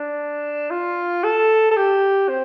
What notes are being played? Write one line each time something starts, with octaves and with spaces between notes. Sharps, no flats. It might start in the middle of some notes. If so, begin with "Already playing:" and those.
Already playing: D4
F4
A4
A4
G4
C4